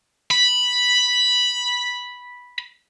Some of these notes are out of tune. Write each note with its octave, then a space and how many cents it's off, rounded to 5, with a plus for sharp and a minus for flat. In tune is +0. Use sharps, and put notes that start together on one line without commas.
B5 -5